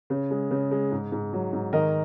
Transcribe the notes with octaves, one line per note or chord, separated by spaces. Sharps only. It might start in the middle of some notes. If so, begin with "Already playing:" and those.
C#3
G#3
C#3
G#3
G#2
G#2
F#3
G#2
D#3 A#4 D#5